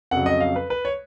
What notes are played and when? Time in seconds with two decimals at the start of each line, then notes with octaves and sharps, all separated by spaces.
0.11 F2 C#3 F#3 F#5
0.26 D#5
0.41 F5
0.56 B4
0.70 B4
0.85 C#5